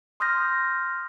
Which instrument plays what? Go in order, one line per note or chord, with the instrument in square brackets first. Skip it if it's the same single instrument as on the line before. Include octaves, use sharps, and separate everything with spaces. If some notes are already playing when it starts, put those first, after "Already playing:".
[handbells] C6 D#6 F6 G6 A#6